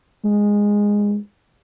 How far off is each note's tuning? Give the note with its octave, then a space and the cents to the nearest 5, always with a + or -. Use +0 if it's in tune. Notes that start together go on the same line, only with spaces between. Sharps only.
G#3 -10